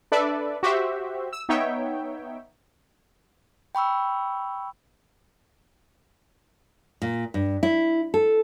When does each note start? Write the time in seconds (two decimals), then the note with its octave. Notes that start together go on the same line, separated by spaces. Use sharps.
0.12 D4 A4 B4 D5 E5
0.63 F#4 G4 C5 E5
1.33 E6
1.49 B3 D#4 C#5 E5 G5
3.75 G5 B5 C#6 E6
7.02 A#2
7.34 G2
7.63 E4
8.14 A4